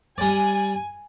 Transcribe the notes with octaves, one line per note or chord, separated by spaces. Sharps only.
G3 D5 G#5